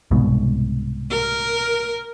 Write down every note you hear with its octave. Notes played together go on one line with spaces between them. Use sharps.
C2 G#2 B2
A#4